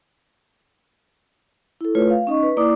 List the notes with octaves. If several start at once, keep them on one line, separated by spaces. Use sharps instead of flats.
E4 A4
A3 F4 B4 C#5
F5
C#4 D#4 D#5 C#6
B4
A#3 E4 D5 D6 D#6